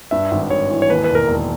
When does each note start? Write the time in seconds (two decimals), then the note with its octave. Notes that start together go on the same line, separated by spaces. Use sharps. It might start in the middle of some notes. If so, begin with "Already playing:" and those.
0.11 G2 E5
0.31 G#1
0.50 G#1 C#5
0.70 E3
0.82 C#5
0.89 D#2 B4
1.04 B4
1.10 E1
1.15 A#4
1.28 E1